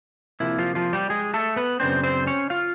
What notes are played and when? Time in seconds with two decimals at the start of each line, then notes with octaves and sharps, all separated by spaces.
0.40 C3 F3 A#3 E4
0.58 F3 F4
0.75 F3 F4
0.93 G3 G4
1.10 G#3 G#4
1.34 A3 A4
1.56 B3 B4
1.80 F#2 C#3 F#3 B3 C4 D4 C5
2.03 C4 C5
2.27 C#4 C#5
2.50 F4 F5